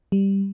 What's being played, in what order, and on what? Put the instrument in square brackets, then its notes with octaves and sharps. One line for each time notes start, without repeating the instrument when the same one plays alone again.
[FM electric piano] G3